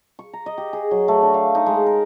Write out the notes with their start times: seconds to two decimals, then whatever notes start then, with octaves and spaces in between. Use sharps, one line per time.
0.19 C#6
0.33 A#5
0.46 D#5
0.58 G4
0.73 G#4
0.91 F#3
1.08 A3
1.22 D4
1.34 F5
1.55 D#4
1.66 G#3
1.86 A#4